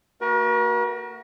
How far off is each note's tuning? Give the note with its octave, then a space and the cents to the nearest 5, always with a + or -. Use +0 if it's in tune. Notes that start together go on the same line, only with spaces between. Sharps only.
A3 +45 F#4 +10 A#4 +45